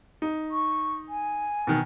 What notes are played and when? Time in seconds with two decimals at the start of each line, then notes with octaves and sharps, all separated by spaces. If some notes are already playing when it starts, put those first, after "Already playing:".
0.22 D#4
0.51 C#6
1.09 G#5
1.67 B2 D#3